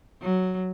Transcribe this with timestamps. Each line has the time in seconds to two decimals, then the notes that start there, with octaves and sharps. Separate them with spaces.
0.22 F#3